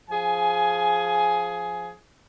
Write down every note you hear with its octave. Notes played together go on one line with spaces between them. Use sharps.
F3 G#4 G#5